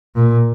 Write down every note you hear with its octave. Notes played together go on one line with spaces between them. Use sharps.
A#2